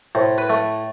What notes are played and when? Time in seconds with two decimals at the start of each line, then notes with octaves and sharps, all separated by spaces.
0.15 A2 C5
0.38 B4
0.50 A3